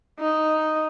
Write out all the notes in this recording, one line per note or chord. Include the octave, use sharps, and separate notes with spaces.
D#4